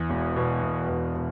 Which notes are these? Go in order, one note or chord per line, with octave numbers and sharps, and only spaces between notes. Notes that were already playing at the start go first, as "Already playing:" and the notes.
Already playing: E2
E1
B2
E1
E2
B2